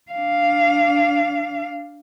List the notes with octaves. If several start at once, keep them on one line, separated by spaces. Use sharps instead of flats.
D4 F5